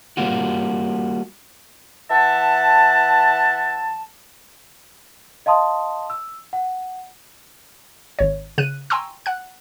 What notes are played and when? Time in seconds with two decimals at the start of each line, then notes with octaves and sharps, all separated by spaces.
0.17 G3 A#3 F4 F#4
2.10 E3 E5 F#5 A5
5.46 D#5 F5 A5 C6 D#6
6.10 E6
6.53 F#5
8.19 G#1 C#5
8.58 C#3 F#6 D#7
8.90 G5 G#5 A#5 C6 C#6 E6
9.26 F#5 F#6